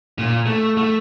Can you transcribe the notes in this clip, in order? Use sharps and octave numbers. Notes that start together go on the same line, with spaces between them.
A#2
A3
A3